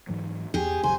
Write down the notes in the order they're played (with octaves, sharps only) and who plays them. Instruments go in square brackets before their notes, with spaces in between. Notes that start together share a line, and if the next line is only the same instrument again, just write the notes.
[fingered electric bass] G#2 E3 F#3
[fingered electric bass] E2 [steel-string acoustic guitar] G4 G#4
[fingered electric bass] D#1 F#2 C#3 [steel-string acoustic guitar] C5 [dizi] G#5